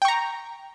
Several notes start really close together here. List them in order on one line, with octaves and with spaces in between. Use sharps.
G5 C#6 A#5